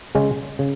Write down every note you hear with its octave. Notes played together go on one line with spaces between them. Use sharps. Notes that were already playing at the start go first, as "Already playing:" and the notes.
C#3 G#3 C#4
C#3